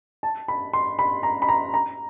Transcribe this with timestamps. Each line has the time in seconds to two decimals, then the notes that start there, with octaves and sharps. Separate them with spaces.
0.23 A5
0.48 B5
0.73 C6
0.99 B5
1.23 A#5
1.42 B5
1.49 A#5
1.74 A#5